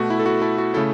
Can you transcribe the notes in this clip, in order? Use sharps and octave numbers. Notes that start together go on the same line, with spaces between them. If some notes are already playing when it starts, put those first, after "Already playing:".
Already playing: B2 A3 F#4
E4
A4
F#4
E4 A4
F#4
C#3 A3 E4 A4